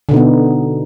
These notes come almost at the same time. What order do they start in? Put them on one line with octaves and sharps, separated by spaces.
D3 B2 D#4 B3